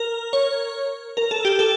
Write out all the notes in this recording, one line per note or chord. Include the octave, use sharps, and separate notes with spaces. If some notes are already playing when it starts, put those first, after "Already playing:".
Already playing: A#4
C#5
A#4
A4
G4
A4